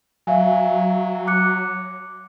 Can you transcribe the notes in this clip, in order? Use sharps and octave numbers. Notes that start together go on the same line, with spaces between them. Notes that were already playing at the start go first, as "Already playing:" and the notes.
F#3 E5 F5 G#5
D6 F#6 C#7